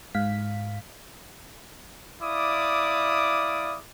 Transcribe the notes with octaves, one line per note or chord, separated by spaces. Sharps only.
G#2 F5 B6
E4 D5 F5 D6 D#6